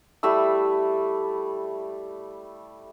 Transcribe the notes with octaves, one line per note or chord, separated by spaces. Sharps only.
G3 A3 E4 E6